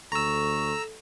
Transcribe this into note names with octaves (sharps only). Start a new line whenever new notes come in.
D2 A4 A#5 C#6 E6